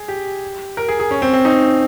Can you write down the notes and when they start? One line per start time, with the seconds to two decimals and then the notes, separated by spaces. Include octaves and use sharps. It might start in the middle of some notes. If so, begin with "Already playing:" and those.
Already playing: G#4
0.08 G4
0.77 A#4
0.88 G#4
1.00 G#4
1.11 C#4
1.22 C4
1.33 C4
1.45 D#4